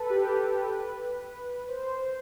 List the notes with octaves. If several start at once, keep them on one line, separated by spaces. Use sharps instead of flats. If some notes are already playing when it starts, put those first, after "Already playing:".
Already playing: A4 B4
G4
A4
B4
C5